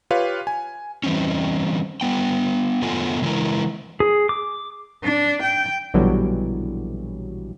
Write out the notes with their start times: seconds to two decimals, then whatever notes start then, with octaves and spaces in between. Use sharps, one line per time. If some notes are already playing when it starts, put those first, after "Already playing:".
0.11 F4 G4 B4 C#5 F5
0.47 G#5
1.04 E3 G3 C4 C#4
2.01 G3 B3 G5
2.82 F#2 A3 B3 F4 A4 G#5
3.22 C#3 E3 G#3 E4 A#4
4.00 G#4
4.29 D6
5.04 D4
5.43 G5
5.94 A#1 B2 D3 E3 F#3 G3